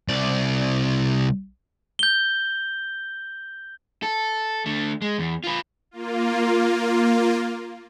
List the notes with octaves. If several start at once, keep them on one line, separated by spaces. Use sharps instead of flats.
C2 D5
G6 G7
A4
D3 A3
G#3
E2
F4 B4
A#3 F4